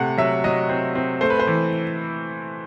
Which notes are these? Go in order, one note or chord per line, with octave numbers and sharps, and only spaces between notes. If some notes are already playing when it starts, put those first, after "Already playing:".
Already playing: C3 A3 F#5
F#3 E5
F#3 D#5
C4
C4
A3 C5
B4
C5
E3